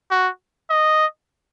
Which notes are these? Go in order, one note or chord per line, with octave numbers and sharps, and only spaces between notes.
F#4
D#5